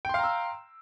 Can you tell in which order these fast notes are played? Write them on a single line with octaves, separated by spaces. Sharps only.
G5 C6 F5 A#5 E6